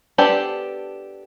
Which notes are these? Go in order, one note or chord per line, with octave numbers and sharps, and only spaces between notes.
B3 D4 G4 A4 C5